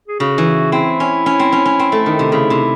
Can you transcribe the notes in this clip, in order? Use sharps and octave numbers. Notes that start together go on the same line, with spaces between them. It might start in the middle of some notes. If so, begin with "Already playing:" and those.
G#4
C#3 F#4
E3
C4 E4
C#4
C#4
C4
C#4
C#4
C4
A3
D#3
C3
C#3 E4
C3